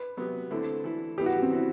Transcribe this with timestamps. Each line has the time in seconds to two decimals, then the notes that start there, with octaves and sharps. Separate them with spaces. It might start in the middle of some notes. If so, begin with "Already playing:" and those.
Already playing: B4
0.17 C3 F#3 B3
0.51 D3 A3 C4 E4
0.84 E3 A3 E4
1.18 E3 G3 B3 E4 G4
1.26 F#4
1.42 C4
1.50 E3 B3 E4